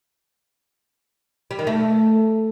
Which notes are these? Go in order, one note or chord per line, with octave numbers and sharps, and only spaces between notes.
G3
D#3
A3